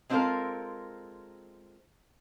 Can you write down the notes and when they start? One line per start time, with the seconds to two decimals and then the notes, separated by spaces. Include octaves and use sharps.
0.10 G#3 C4 D4 F4 A4 A#4